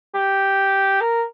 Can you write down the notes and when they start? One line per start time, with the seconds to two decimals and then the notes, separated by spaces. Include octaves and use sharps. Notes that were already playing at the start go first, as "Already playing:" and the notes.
0.14 G4
1.01 A#4